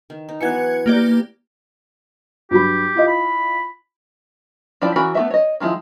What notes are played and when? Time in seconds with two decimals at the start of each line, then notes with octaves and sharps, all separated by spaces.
0.10 D#3
0.29 D#4
0.41 E3 F#3 B3 F#6 G#6 C#7
0.86 A#3 G4 D5
2.51 G2 F#3 G4 B5
2.95 E4 F4 D#5
3.08 B5
4.82 F3 D4 E4 D5 G5
4.96 E3 C#4 F#4 A#4 B5
5.15 A3 B3 F#4 A4 E5
5.30 C#5 D#5
5.60 D#3 F3 G#3 E4